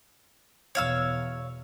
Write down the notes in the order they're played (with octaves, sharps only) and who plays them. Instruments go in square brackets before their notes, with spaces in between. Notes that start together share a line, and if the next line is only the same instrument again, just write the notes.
[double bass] E2 B2 [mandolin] C#5 F5 E6